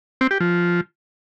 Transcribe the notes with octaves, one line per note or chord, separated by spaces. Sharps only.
C4
G4
F3